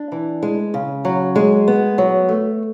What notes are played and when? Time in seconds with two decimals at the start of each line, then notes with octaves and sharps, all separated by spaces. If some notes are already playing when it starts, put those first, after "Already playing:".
Already playing: D4
0.12 E3
0.43 G#3
0.74 C#3
1.05 F#3
1.36 G#3
1.68 B3
1.98 F#3
2.29 A3